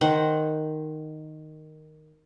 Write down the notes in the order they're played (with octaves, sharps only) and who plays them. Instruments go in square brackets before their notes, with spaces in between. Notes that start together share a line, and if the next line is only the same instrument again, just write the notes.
[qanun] D#3 C5 F#5